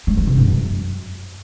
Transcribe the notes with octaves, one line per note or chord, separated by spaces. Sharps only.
G3
E3
C3
G#2
F#2